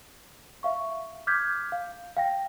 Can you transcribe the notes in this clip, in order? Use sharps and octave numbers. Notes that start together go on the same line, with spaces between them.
E5 F5 C#6
D6 F6 G6 G#6 B6
F5
F5 G5 A#6